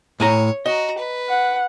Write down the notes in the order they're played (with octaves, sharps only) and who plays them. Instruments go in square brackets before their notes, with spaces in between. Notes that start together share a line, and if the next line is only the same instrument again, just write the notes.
[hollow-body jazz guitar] A2 G#5 A#5 [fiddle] C#5
[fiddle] F#4 A#5 [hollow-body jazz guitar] D#5
[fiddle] B4
[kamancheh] F#5